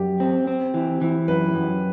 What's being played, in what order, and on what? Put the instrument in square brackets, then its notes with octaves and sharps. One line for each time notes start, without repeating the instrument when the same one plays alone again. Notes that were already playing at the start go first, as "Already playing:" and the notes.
Already playing: [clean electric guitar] F#2 [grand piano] G4
[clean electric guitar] C4
C4
E3
E3
[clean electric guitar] F#2 [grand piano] B4
[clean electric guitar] F#2